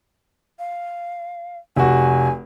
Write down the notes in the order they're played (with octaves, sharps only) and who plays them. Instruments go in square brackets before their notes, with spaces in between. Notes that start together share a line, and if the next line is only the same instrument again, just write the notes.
[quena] F5
[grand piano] F1 F#4 [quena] G#5